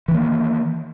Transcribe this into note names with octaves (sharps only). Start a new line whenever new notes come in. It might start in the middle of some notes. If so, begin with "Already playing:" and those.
D#3 E3 A#3